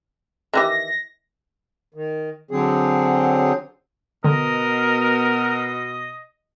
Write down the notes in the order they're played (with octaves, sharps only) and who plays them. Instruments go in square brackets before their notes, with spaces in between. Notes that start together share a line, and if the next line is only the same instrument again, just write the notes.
[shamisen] D#3 E3 G4 [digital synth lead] A#6
[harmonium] D#3
D3 F#3 C4 G#4
[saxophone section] B2 [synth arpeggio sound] D3 [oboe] A#4 [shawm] D#5